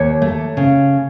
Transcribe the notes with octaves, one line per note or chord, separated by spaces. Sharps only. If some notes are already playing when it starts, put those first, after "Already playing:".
Already playing: D#2 C#5
A3
C#3